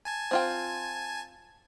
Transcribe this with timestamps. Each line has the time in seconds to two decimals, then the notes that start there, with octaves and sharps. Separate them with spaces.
0.05 G#5 A5 G#6
0.31 C4 F4 G5